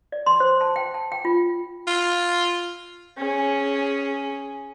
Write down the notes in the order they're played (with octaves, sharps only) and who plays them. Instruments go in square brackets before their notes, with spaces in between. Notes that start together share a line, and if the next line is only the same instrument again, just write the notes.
[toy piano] D5
C6
C5
A5
G5
A5
G5
F4
[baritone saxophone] F4
[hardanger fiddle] C#4 G#4